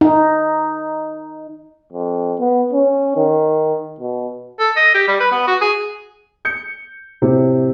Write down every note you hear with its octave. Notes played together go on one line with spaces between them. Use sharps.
D#4
F2
B3
C#4
D#3
B2
A4
D#5
G4
G3
B4
B3
F#4
G#4
G6 C#7
A2 C3